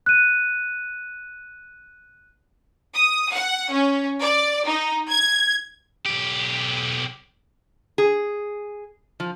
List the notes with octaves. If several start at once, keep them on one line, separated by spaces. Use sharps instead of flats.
F#6 D#7
D#6
F#5
C#4
D5
D#4
G#6
B1 G4
G#4
F3